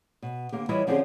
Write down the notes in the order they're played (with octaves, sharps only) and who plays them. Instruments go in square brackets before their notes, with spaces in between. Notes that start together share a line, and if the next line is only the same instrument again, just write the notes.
[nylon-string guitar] B2
D3 A#3 G4
E3 G3 E4 F4 C#5 D#5
D3 F3 C4 C#4 G4 G#4